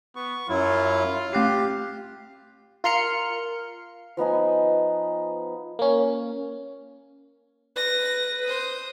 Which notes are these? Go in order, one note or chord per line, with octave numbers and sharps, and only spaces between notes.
B3 C#6
F#2 F#3 E4 F4
A3 G4 F#6 C7
F4 A#4 C6 F6 C#7
F3 B3 D#4 G#5
A#3 C#4
B4 A#6
C5 D#6